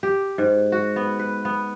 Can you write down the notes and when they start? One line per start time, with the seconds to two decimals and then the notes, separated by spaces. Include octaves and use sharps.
0.03 G4
0.38 G#2
0.72 F#4
0.96 B3
1.19 B4
1.45 B3